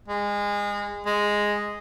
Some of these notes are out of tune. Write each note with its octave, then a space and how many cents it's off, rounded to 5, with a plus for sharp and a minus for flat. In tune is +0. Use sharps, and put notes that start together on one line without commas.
G#3 -25
G#3 -5